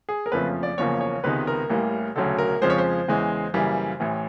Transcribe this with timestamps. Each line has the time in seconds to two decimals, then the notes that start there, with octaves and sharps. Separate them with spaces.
0.09 G#4
0.26 A#4
0.32 F#1 F2 C#3 F3 A3 B4
0.63 D5
0.78 F#1 E2 C#3 F3 A#3 C#5
1.01 C#5
1.24 C#2 C3 D#3 G#3 B3 B4
1.47 A#4
1.70 A1 A2 E3 G3 A#3
2.15 E1 D2 C#3 F#3 A4
2.38 A#4
2.61 F2 C#3 F3 G#3 C5
2.70 C#5
2.78 C5
3.08 E2 C#3 E3 G#3
3.54 F#2 C#3 E3 G3 A#3
4.00 A1 A2 E3